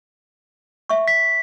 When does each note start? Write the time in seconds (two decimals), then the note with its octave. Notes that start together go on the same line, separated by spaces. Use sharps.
0.89 E5 C#6
1.08 B6